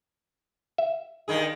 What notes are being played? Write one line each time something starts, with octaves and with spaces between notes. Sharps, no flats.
E5
G2 D#3 G#4